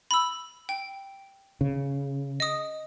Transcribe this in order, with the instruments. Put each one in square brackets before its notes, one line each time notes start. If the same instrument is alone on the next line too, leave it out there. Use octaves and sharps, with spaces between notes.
[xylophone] B5 E6
G5
[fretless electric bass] C#3
[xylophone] D#5 D#6